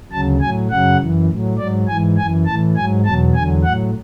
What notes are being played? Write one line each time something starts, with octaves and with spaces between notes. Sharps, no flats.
D2 C#3 F#3 A5
A2 F#3 G#5
F#2 C#3 F#3 F#5
F#2 E3
A2 F#3
G#2 F#3 D5
G#2 E3 G#5
F#2 E3 G#5
A2 E3 A5
G#2 F#3 G#5
E2 B2 F#3 A5
E2 D3 F#3 G#5
A2 F#3 F#5